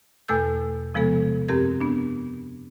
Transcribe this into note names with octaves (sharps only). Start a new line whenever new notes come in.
E2 B2 A3 A4 E6 G6
C3 F3 G#3 B3 A4
F#2 C4 G4 A#4 G#6
B3 D4